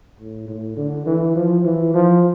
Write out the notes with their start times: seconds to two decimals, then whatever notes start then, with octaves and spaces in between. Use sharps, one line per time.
0.19 A2
0.48 A2
0.77 D3
1.06 E3
1.36 F3
1.65 E3
1.94 F3